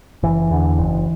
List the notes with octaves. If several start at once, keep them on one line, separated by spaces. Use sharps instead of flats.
F#1 E3
E2 D3
F#1